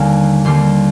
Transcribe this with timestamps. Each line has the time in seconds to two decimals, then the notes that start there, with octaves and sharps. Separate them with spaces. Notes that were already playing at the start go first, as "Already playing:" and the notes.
Already playing: D#2 D3 G3 A#3 F5 G#5
0.45 D#2 D3 G3 A#3 C6